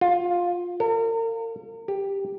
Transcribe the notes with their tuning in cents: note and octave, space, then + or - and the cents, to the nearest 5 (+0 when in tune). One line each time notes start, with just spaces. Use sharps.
F4 +15
A#4 -40
G4 +5